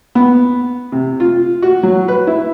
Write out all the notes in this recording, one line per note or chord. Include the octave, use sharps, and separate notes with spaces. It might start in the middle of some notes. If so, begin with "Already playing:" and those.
B3
C3
F4
F#4
F#3
B4
E4